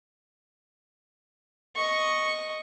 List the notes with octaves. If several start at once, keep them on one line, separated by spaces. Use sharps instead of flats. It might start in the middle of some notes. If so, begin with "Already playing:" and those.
D#5 C#6